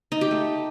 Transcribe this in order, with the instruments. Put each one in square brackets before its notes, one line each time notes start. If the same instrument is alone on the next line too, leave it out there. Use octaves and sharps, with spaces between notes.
[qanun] D#4
G4
A3